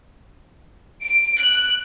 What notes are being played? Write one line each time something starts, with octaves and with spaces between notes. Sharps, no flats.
D7
F#6